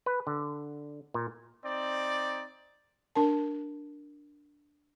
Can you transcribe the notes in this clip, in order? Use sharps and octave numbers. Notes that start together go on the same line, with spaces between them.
B4
D3
A#2
C4 D#4 D5
D4 A#4 A5